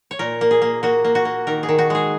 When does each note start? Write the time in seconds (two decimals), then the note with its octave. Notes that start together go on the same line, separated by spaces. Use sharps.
0.11 C#5
0.19 A#2 A#4
0.41 A#3
0.51 G#4
0.62 A#3
0.83 A#3 F#4
1.04 A#3
1.15 F#4
1.25 A#3
1.47 D#3 A#4
1.63 G#4
1.69 D#3
1.78 F#4
1.90 G#3 G#4